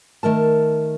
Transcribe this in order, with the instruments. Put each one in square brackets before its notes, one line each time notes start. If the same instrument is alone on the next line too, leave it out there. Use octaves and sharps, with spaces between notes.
[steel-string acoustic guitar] D#3 A3 A#4 A5